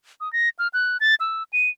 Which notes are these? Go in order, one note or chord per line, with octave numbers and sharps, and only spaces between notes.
D#6
A#6
F6
F#6
A6
E6
D#7